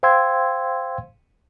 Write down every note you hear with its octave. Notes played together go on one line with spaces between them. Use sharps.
C5 F5 G5 C6 E6 G#6